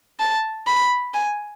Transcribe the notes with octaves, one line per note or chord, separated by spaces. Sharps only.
A5
B5
G#5